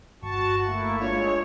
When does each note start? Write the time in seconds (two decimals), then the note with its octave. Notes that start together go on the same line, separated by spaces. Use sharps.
0.22 G1 F#4 A5 C#6
0.65 A3 A#3 E4
1.01 G#3 D4 F4 C#5